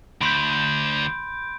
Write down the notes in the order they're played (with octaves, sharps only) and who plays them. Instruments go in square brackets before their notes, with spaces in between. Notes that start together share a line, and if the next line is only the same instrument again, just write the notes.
[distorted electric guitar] D2 [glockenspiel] B5 C6 [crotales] G6 D7